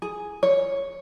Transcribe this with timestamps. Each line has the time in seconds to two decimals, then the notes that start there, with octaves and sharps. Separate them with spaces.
0.02 G#4
0.43 C#5